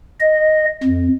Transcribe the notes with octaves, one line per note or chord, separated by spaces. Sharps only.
D#5
F2